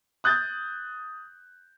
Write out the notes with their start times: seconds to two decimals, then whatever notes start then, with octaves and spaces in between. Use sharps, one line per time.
0.24 D#6 F#6 G6 A6